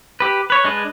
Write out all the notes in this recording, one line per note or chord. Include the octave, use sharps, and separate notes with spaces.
G4 B4
B4 C#5
G#3 D4 G#4 B4